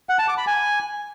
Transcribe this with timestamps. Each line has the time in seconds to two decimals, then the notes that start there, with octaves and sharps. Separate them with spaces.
0.09 F#5
0.19 A5
0.28 D6
0.38 B5
0.47 G#5